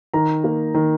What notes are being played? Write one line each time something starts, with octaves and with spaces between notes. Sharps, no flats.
D#3 A#5
A#3
D#3